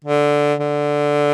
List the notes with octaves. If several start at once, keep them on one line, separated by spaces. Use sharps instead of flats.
D3
D3